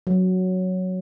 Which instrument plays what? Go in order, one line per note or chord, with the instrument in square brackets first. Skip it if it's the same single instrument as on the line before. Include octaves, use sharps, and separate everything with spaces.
[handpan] F#3